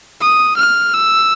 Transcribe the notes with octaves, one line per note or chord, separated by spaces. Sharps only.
D#6
F6
E6